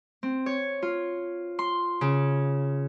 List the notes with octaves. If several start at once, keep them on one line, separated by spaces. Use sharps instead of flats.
C4
C#5
F4
C6
C#3